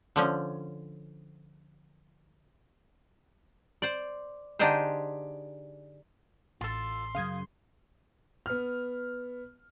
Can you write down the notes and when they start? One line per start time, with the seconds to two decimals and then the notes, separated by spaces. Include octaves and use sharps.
0.16 D3 F3 C#4
3.82 C5 D5
4.59 D3 D4 D#4 G4 G#4 C5
6.61 A1 F4 A4 C6
7.15 F#2 C#3 F5 D#6 G#6
8.46 B3 F6